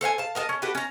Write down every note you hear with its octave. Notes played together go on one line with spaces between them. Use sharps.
A4 C5 F5 G#5
F5 A5
A#4 D#5 F5 A5
C#4
F#4 G4 A4 B4
C#4 A#5